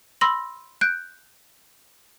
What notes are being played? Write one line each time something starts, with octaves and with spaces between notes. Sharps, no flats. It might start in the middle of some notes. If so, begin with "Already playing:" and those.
B5 C6 E6 A#6 F#7
F#6 G6 D7